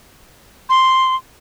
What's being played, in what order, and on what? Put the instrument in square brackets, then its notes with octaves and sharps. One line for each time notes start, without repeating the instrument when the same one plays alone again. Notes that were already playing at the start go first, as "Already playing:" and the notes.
[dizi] C6